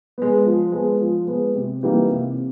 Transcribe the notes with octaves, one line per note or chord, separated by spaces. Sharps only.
G#3 B3
F3
G#3 B3
F3
G#3 B3
C3
E3 G3 A#3 D#4
C3